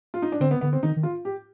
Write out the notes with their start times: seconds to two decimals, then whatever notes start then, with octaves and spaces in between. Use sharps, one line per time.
0.14 F4
0.22 D#4
0.32 D4
0.40 D3 C4
0.51 B3
0.61 D3 B3
0.73 C4
0.83 D#3 D#4
0.96 D#3
1.03 F4
1.25 G4